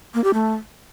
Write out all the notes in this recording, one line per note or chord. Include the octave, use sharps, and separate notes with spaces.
A#3
G4
A3